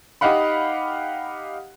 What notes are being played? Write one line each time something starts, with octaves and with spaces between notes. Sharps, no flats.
D#4 G4 D#5 F5 F#5 B5